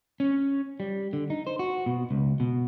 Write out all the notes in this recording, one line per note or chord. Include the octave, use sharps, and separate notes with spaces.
C#4
G3
D3
D#4
C5
F#4
B2
C#2
B2